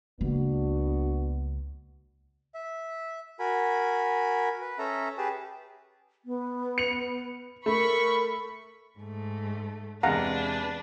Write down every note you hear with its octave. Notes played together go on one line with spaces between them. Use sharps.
C#2 A#3 B3 D4 F#4
E5
F#4 A#4 G#5 B5
B4
C#4 A4 E5 A#5
G4 G#4 B4 A5
B3
C#7 F7
A3 A#4 B5 C#6
G#2 A3
E2 C3 G#3 D4 B4 F5 F#5 A#5